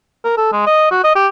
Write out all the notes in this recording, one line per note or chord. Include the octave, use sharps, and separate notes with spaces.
A#4
A4
G#3
D#5
F#4
D#5
G4